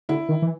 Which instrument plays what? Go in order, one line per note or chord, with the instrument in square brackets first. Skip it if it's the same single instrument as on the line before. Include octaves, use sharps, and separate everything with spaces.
[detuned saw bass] D3 [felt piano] E4
[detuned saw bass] D#3
E3